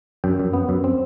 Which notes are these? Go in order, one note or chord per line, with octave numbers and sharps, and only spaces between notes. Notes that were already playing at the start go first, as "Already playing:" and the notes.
F#2 G5
F#2
B3
F#2
C4